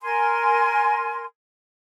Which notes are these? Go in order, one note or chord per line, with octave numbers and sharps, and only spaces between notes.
A#4 G#5 C6